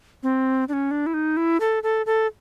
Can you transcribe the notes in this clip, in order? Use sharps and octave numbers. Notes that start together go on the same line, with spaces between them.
C4
D4
C#4
D4
E4
D#4
E4
A4
A4
A4